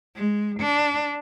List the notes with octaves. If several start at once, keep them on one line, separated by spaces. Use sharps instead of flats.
G#3
D4